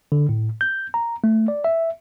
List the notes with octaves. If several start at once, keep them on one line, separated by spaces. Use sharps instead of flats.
D3
A2
G6
A#5
A3
D5
E5